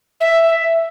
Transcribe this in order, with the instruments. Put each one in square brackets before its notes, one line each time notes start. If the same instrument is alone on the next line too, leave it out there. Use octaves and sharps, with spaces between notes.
[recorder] E5